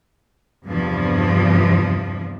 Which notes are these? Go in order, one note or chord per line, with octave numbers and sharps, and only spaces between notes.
E2 G2 C3 F3